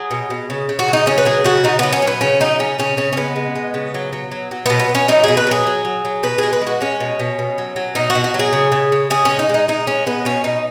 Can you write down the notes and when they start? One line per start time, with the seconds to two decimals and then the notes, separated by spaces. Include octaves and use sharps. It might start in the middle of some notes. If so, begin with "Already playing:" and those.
Already playing: F#3 G#4
0.11 B2
0.30 B2
0.50 C#3
0.69 C#3
0.79 F#4
0.88 F#3
0.93 D#4
1.06 C#3 C#4
1.18 B4
1.25 F#3 G#4
1.44 C#3 F#4
1.64 C#3 D#4
1.79 F#3 B3
1.93 C#4
2.02 F#3
2.07 B3
2.21 C#3 C#4
2.40 F#3 D#4
2.59 C#3 C#4
2.79 C#3 C#4
2.97 C#3 C#4
3.13 C#4
3.17 G#3 B3
3.36 G#3
3.55 G#3
3.74 C#3
3.94 F#3
4.13 F#3
4.31 F#3
4.51 F#3
4.66 B2 B3
4.79 B3
4.89 B2
4.95 C#4
5.08 F#3 D#4
5.24 B2 G#4
5.37 B4
5.47 F#3 G#4
5.67 F#3
5.85 F#3
6.05 F#3
6.23 B2 B4
6.38 G#3 G#4
6.53 B4
6.61 G#3
6.67 F#4
6.81 G#3 C#4
7.00 B2
7.19 B2
7.39 B2
7.58 F#3
7.76 F#3
7.95 B2 D#4
8.10 F#4
8.15 B2
8.24 F#4
8.34 F#3
8.39 G#4
8.53 C#3
8.72 C#3
8.92 C#3
9.10 C#3 G#4
9.25 C#4
9.30 G#3
9.39 D#4
9.49 G#3 D#4
9.68 G#3 D#4
9.87 G#3 C#4
10.06 G#3 B3
10.25 B2 C#4
10.44 B2 D#4